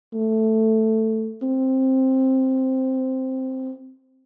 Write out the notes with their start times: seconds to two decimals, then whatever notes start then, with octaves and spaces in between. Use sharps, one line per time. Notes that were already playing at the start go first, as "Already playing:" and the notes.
0.14 A3
1.42 C4